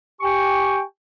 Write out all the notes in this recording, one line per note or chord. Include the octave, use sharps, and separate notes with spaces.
G4 G5 G#5 C#6